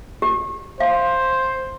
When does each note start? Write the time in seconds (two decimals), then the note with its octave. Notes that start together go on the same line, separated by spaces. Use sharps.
0.22 G4
0.80 C5 F5